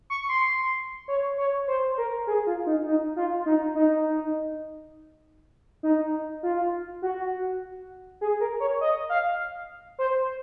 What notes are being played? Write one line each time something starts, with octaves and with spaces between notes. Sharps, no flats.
C#6
C6
C#5
C#5
C5
A#4
G#4
F4
D#4
D#4
F4
D#4
D#4
D#4
F4
F#4
G#4
A#4
C#5
D#5
F5
C5